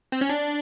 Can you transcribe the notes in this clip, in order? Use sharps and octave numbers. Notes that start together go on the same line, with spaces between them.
C4
C#4
D4